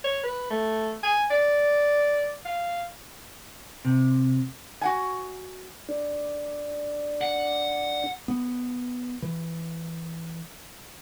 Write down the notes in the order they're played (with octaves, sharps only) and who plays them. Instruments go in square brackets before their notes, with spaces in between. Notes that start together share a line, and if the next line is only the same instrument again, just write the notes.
[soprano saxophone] C#5
B4
A3
G#5
D5
F5
[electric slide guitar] C3
[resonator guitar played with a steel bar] F#4 F#5 G#5
[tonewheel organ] D4
[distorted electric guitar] F#5
[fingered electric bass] B3
E3